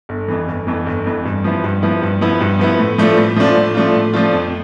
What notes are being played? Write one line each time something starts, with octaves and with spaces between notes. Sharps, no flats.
G1
F2 E3
G1
F2 E3
G1
F2 E3
G2
F3 B3 E4
G2
F3 B3 E4
G2
F3 B3 E4
G2
F3 B3 E4
A2
F3 A3 D4 F4
A2
F3 A3 D4 F4
A2
F3 A3 D4 F4
A2
F3 A3 D4 F4
F2